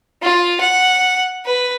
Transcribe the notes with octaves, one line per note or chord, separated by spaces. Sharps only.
F4
F#5
B4